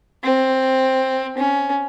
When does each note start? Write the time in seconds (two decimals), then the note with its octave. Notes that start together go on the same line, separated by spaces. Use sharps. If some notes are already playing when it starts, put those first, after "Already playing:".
0.24 C4
1.37 C#4